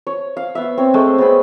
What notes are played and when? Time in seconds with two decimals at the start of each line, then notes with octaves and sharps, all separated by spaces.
0.07 C#5
0.37 F5
0.55 B3 E5
0.78 C4 C#5
0.94 G#3 A3
1.18 B3 C4 G#4 B5